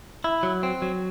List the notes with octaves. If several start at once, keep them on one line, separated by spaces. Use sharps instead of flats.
E4
F#3
C4
F#3